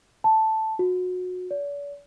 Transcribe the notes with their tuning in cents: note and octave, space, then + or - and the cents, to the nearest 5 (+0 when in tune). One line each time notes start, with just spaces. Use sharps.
A5 +0
F#4 -25
D5 -45